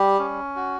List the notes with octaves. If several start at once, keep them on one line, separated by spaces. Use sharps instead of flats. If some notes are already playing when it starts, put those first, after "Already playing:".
Already playing: G3 G4
C#4
F#4